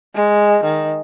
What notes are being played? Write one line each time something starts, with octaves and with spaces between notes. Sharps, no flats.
G#3
D#3